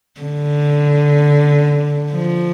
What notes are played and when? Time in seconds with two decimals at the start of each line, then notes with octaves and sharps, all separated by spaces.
0.21 D3
2.11 F3